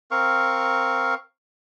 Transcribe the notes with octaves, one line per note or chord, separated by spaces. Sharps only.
C4 A#4 F5 C#6